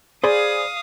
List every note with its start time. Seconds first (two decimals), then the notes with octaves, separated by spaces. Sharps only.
0.24 G#4 C5 D5 F5 B5 D#6